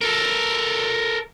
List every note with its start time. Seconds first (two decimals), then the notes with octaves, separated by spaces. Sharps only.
0.01 A4 A#4